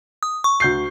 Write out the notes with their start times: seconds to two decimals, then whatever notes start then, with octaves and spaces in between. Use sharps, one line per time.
0.23 D#6
0.44 C#6
0.60 D2 G6 C7